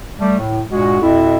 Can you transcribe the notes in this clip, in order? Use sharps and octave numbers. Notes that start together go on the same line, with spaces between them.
G3 A3
A2
G2 A#2 G#3 F#4
F2 B2 E4